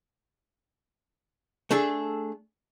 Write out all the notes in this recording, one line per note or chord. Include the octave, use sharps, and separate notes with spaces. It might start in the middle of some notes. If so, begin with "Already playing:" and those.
A3 D4 G#4 A4